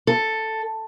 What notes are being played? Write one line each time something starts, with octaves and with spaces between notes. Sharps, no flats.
A4